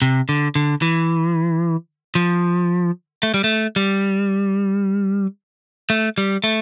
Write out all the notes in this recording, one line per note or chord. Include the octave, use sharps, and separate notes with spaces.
C3
D3
D3
E3
F3
A3
G3
A3
G3
A3
G3
A3